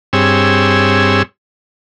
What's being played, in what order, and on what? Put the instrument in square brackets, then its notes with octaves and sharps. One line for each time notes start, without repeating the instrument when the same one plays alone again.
[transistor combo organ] G2 C4 G#4 C#5 E6